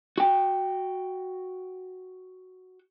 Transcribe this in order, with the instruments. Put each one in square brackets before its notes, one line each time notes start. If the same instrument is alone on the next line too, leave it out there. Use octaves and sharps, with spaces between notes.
[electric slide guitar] F#4 G5